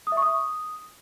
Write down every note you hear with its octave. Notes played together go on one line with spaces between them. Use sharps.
D#6
E5
C#6
D#6